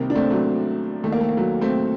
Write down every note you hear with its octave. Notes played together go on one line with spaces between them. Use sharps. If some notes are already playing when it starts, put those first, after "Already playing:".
Already playing: C2 C3 D#3 A#3
D4
A3 C4
F#3 A3
D#2 D#3 A3
A#3
A3
A#3
F#3 A3
A3 C4